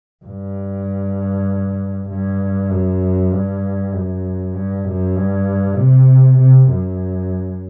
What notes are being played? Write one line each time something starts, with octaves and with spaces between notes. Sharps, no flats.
G2
G2
F#2
G2
F#2
G2
F#2
G2
C3
C3
F#2